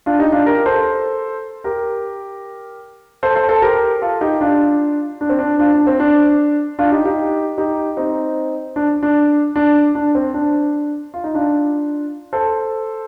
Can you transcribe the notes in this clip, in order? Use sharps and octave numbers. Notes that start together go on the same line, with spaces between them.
D4 F4
D#4 G4
D4 F4
G4 A#4
A4 C5
G4 A#4
A4 C5
A4 C5
A4 C5
G4 A#4
F4 A4
D#4 G4
D4 F4
D4
C4
D4
D4 F4
D4
C4
D4
D4 F4
D#4 G4
D#4 G4
D#4 G4
C4 D#4
D4
D4
D4
D4
C4
D4
F4
D#4
D4 F4
A4 C5